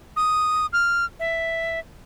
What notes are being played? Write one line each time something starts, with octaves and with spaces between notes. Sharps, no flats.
D#6
F6
E5